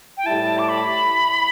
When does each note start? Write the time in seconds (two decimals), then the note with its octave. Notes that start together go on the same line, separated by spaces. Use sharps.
0.17 G5
0.26 A2 G3 E4 A5
0.59 D6
0.69 B5